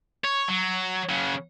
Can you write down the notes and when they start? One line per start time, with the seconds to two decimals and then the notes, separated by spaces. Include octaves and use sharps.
0.24 C#5
0.49 F#3
1.09 C#3 F#3